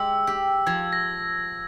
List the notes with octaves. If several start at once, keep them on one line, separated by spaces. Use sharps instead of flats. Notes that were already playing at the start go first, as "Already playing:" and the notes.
Already playing: G#3 G4 E6
G4
F3 G#6
A#6